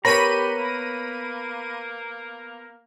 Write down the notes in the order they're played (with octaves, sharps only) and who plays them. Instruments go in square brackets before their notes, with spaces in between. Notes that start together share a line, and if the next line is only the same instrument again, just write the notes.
[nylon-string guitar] B3 A#4 C#5 [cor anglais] G4 [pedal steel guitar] A#5 [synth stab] B5 D#7
[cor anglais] A#3